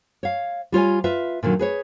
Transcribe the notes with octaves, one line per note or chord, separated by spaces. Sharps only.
C#5 F5
G3 F4 C#5 G#5
F4 B4 E5
A#2 D3 D#3 F#3
G#4 B4 C#5